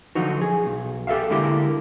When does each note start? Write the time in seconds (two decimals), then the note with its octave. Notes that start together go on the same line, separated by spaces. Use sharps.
0.15 D3 F3 F#3 D#4 F#4
0.41 G#4
0.66 B1
1.07 G4 A4 A#4 E5 F5
1.30 D3 G#3 A#3 E4 G4 A#4